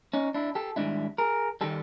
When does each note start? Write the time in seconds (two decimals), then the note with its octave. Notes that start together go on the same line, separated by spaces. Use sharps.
0.13 C#4 D#4
0.34 D4 E4
0.55 G4 A4
0.76 G#2 D#3 G3 D4 E4
1.18 G#4 A#4
1.61 D#3 G3 G4 A4